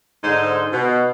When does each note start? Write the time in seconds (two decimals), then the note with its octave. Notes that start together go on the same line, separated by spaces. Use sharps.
0.24 G#2 D3 D#4 C5
0.73 B2